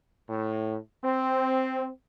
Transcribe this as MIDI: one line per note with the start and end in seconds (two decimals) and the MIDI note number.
0.29 0.77 45
1.04 1.88 60